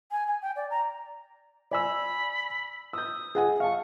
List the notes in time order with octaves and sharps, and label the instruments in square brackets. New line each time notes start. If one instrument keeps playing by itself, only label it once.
[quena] G#5
G#5
G5
D5
A#5
[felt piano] D5 G#5 E6 [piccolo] B5
[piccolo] D#6 [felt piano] E6 G6
[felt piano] G#4 F#5 G#5
[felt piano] F5 A5 [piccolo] C#6